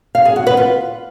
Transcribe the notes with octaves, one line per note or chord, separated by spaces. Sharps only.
F5
G#4
F#4
B4
F4